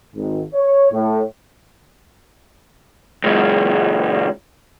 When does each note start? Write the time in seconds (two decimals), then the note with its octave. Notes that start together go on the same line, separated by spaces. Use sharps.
0.15 G#1
0.54 C#5
0.92 A2
3.24 C#2 F#2